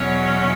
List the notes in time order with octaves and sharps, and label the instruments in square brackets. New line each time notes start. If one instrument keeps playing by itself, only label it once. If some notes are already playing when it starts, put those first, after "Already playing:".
Already playing: [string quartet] E2 B2 F#3 C#4 C#5